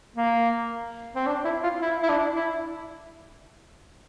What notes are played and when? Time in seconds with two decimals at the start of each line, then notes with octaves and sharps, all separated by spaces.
0.16 A#3
1.15 C4
1.27 D4
1.44 E4
1.63 F4
1.81 E4
2.03 E4
2.09 D4
2.36 E4